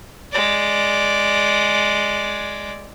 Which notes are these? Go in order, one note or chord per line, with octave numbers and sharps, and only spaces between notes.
G#3 D5